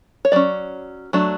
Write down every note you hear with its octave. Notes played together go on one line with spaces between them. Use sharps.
C#5
F#3 C#4 D5
F#3 A3 D4